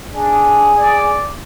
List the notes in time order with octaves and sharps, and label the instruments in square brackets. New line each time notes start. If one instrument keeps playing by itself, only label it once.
[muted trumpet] D4 [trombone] G#4
[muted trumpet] D5